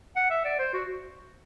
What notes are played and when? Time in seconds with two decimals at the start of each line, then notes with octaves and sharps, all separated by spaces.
0.16 F#5
0.30 E5
0.45 D5
0.59 C5
0.73 F#4